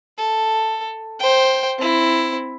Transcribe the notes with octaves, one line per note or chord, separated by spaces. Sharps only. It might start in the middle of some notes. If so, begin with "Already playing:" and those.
A4
C5 G5
C4 E4